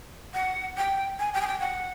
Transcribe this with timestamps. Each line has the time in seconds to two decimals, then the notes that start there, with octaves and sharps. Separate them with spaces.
0.34 F#5
0.77 G5
1.19 G#5
1.33 G5
1.41 G#5
1.47 G5
1.60 F#5